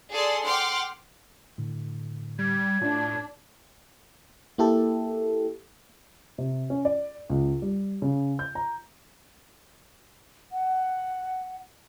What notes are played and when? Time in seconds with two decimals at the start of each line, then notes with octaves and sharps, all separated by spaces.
0.11 G#4 A4 D5 A5 C6
0.45 F#5 G5 C6 D6 F6
1.58 A2 D3
2.39 G3 G#6
2.81 A2 D4 F4
4.58 A#3 E4 G4 A4
6.38 C3
6.70 C#4
6.85 D5
7.30 C#2
7.62 G3
8.02 C#3
8.39 G6
8.55 A#5
10.52 F#5